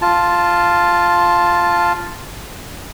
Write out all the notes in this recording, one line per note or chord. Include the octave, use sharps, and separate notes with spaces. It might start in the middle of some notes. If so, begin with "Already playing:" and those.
F4 A5